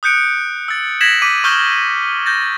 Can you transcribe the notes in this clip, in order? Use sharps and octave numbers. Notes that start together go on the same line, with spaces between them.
D#6 F#6 G6 C#7 D7
E6 A6
G#6 A#6 B6 E7 F#7
D6 B6 D#7
C#6 D#6 F6 G6 G7
G6 A6 A#6